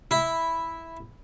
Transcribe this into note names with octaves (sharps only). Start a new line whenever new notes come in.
E4